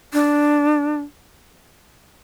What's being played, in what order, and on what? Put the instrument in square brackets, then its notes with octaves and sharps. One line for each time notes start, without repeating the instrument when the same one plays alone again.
[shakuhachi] D4